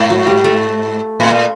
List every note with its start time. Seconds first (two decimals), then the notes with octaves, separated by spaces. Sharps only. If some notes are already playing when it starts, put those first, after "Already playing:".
Already playing: G#2
0.10 F#3
0.27 G3
0.44 A3
1.20 A2
1.30 A#2